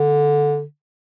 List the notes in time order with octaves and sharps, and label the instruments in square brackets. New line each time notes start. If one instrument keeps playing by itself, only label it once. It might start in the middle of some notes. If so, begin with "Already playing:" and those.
Already playing: [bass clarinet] D3